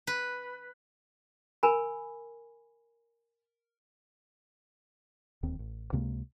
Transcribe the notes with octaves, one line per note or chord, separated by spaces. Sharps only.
B4
A#4 G#5 B5
D1 D#2 D#3 C4
A1
C#2 C3 G#3 A#3